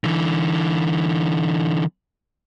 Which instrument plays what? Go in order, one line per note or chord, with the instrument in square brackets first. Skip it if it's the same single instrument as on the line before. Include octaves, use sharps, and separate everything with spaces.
[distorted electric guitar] D3 E3